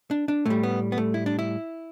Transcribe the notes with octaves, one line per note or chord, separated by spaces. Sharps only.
D4
D4
A2 G3 A3
B3
B3
A3
E4
D4
E4